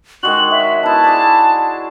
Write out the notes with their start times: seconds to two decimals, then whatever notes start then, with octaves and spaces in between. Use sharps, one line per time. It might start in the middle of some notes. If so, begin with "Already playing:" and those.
0.23 D#3 G#3 F#4 F#7
0.51 C#5 E5
0.83 B3 E4 A5
1.04 G#4 C5 D5